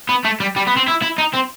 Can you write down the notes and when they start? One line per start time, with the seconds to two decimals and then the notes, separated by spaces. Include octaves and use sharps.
0.09 B3
0.25 A3
0.40 G3
0.56 G3
0.67 B3
0.76 C4
0.88 E4
1.02 E4
1.19 D#4
1.34 C4